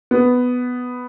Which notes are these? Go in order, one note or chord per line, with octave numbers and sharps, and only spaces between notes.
B3